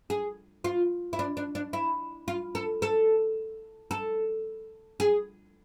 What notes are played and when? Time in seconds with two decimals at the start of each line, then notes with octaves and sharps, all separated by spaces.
0.10 G#4
0.64 F4
1.13 E4
1.19 D4
1.37 D4
1.55 D4
1.73 E4
2.28 F4
2.55 A4
2.82 A4
3.91 A4
5.00 G#4